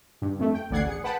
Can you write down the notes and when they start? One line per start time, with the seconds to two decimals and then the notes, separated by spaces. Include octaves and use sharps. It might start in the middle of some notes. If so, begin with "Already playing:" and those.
0.22 G2
0.39 F2 A3
0.55 G5
0.71 A1 D2 D5 F#5 G#6 C7
0.87 G#4 C#7
1.04 B4 F#5 G5 A5 B5